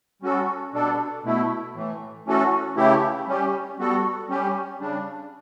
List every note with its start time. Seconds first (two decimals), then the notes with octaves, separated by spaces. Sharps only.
0.22 G3 C#4 F#4 A4
0.73 B2 G3 D4 A4
1.24 B2 A3 E4
1.74 A2 E3 A3
2.26 E3 A3 C#4 F#4 A4
2.76 C#3 E3 A3 E4 G4
3.27 G3 C#4 G4
3.79 G3 B3 F#4 A4
4.29 G3 C#4 G4
4.80 C#3 G3 D4